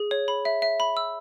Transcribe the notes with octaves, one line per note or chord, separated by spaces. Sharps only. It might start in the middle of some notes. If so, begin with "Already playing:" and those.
Already playing: G#4
C#5
B5
E5
E5
B5
E6